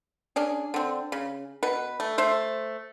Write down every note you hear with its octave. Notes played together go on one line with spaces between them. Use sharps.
C#4 D4 G#4
D3 C4
C#3
B2 B4
A3
A3 C5 E5